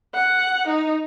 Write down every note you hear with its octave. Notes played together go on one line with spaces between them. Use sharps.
F#5
D#4